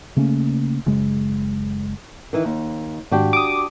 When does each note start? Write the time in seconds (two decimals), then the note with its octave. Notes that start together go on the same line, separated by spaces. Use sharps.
0.16 C#3 A3 A#3 C#4
0.86 F#1 C#3 G#3
2.33 D#3 E3
2.45 D#2
3.12 G#1 D4 F#4 G4
3.33 D6 D#6